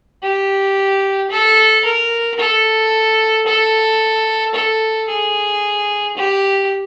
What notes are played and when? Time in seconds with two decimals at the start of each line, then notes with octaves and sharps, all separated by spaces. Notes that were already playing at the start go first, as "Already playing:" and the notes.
0.23 G4
1.31 A4
1.85 A#4
2.39 A4
3.46 A4
4.54 A4
5.09 G#4
6.17 G4